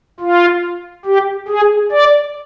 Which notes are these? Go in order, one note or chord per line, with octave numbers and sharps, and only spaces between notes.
F4
G4
G#4
D5